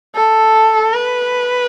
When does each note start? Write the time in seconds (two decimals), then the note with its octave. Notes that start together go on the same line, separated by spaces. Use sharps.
0.15 A4
0.94 B4